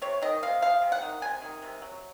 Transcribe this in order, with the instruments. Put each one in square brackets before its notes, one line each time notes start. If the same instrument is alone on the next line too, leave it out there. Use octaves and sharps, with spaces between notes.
[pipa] C3 C#5
D#3 D#5
C3 F5
G#3 F5
C3
F#5
D#3
C3 G#5
D#3
C3
F#3